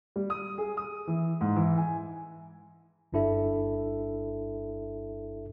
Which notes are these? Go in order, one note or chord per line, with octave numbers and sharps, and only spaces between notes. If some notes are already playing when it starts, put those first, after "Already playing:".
G3
D#6
G#4
D#6
E3
G#2
E3
G#5
G1 G2 D4 E4 A4 E5